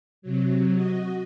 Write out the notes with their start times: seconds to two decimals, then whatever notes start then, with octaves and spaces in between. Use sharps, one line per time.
0.22 C3 F#3
0.73 F#4 D#5